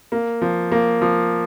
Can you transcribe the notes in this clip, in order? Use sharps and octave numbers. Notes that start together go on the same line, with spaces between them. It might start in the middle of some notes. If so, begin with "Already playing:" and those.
A#3
F3
A#3
F3